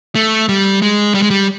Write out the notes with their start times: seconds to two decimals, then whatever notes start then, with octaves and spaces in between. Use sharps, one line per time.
0.15 A3
0.49 G3
0.82 G#3
1.15 G3
1.22 G#3
1.30 G3